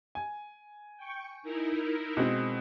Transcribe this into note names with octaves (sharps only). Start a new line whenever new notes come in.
G#5
G5 C#6
D#4 E4 A#4
B2 G#3 C4